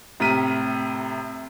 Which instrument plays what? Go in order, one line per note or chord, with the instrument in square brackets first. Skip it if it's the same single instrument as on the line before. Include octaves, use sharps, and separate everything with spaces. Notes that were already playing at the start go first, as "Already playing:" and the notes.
[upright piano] A2 C3 A#5 F6 B6 D#7